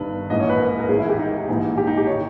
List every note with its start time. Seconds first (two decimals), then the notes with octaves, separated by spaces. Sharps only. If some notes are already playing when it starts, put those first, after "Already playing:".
Already playing: G1 G2 D#3 B4
0.30 A#1 G#2 E3 D#5
0.40 C#5
0.49 B4
0.60 A#4
0.69 B4
0.80 A#4
0.89 G#1 G#2 E3 G#4
0.99 E4
1.09 G4
1.19 D#4
1.48 A#1 G#2 E3
1.78 G4
1.87 D#4
1.98 G4
2.07 D#3 C#5